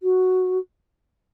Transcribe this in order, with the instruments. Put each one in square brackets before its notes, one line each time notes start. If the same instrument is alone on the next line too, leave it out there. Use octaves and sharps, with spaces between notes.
[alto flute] F#4